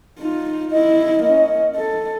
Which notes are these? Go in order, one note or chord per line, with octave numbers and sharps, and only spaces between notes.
D#4 F4
E4 D#5
A#3 C#4
A4